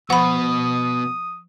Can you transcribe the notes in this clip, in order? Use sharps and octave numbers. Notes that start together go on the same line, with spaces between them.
B2 F3 F#5 B5 D#6